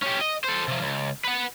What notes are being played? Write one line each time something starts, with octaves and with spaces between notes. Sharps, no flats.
C#4 G4
D#5
A4 C5
C3 F3
C#2
B4 F#5